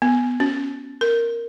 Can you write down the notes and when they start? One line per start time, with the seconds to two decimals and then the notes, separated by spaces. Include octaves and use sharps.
0.02 B3
0.40 C#4
1.01 A#4